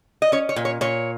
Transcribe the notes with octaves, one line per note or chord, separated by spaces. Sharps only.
D#5
C#4 C#5
C#5
A#2
C#5
A#2 C#5